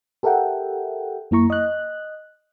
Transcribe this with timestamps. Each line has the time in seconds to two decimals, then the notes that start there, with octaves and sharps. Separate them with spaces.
0.23 G4 A4 A#4 E5 F#5 G5
1.31 F#2 A#3 E4 A#5 C#6
1.50 D#5 F#6